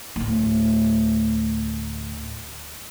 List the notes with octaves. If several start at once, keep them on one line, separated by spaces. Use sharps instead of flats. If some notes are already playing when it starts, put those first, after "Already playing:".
D2 A2